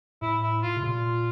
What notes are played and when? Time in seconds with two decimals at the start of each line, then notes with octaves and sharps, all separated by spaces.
0.22 A2 E4
0.43 E4
0.62 F4
0.76 C3
0.82 A#2 F4